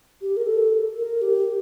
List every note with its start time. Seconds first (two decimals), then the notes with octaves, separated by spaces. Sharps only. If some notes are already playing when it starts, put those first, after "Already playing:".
0.22 G4
0.37 A#4
0.46 A4
0.97 A#4
1.22 G4